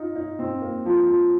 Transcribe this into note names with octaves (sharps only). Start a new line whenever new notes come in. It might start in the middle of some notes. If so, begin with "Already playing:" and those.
Already playing: D#4 F4
D#4
C4
A#3
F3
F3